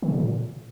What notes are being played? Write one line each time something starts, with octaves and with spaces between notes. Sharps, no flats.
D#3
C3
C#3
A#2